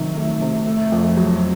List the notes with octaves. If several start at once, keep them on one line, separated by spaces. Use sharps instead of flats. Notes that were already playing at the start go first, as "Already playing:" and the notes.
Already playing: C3 D#3 F#3
A3
C3
A3
F2
F#3